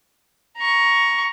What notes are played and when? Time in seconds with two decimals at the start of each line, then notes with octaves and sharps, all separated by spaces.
0.57 A#5 C#6